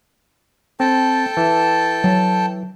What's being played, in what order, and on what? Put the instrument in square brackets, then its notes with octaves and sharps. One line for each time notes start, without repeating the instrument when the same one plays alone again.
[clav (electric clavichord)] C4 [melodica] A4 G5 A5
[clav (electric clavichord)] E3
[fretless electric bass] F#3